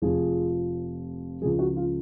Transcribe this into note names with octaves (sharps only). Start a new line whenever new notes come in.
F1 F2 F3 G#4
C#2 C#3 F3 G#4
F#4
F4